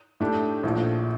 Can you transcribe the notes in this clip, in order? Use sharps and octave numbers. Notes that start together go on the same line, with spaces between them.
A2 A3 D4 G4
A#1 A2 F3